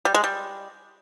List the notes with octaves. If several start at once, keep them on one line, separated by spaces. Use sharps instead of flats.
G3
G#3
G3